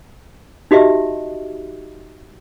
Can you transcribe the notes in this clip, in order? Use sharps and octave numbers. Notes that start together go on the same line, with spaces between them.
D#4 F#4 G4 D#5 E5